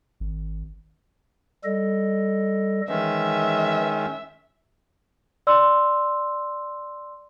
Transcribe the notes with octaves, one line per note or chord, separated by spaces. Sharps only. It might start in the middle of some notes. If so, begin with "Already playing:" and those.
G#1
G3 A4 D#5
D#3 E3 G#3 C#4 E5
D5 C6 E6